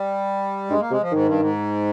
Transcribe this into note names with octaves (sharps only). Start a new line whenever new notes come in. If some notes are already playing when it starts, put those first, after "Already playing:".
Already playing: G3
G2 G#3
A#3
C3 G#3
F3
G#2 D#3
G2
G#2